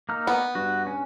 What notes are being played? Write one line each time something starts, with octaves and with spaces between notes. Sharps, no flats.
A#3 D#4 F6
B3
G2 F#4
C#4